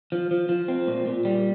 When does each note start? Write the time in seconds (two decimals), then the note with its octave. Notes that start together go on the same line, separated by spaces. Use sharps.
0.12 F3
0.31 F3
0.49 F3
0.68 C4
0.88 A#2
1.06 A#2
1.25 G3